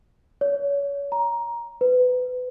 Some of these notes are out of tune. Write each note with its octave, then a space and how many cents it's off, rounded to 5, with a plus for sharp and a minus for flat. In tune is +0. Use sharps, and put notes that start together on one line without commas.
C#5 +30
A#5 +15
B4 +25